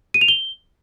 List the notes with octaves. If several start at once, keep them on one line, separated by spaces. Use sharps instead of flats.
D#7
F7
G7